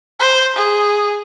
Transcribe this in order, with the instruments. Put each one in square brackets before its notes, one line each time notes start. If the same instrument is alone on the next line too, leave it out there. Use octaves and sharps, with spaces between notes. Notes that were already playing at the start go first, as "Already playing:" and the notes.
[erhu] C5
G#4